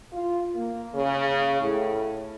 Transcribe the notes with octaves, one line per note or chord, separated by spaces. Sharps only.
F4
A#3
C#3
A2